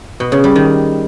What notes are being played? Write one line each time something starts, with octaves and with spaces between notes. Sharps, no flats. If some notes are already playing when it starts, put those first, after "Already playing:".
B2
C#3
G3
D#3